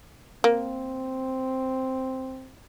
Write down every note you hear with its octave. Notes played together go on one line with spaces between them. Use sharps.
A#3 C4